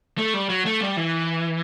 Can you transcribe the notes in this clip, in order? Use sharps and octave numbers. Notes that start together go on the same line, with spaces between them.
A3
G3
F#3
A3
G3
E3